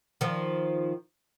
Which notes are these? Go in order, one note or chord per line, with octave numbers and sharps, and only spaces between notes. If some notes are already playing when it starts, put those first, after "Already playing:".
D#3 F3